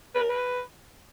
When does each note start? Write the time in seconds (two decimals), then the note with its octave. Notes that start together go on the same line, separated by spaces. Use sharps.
0.15 B4
0.21 A#4
0.30 B4